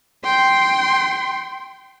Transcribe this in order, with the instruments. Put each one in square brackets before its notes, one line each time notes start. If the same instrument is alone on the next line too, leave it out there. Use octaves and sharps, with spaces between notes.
[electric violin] G5 C6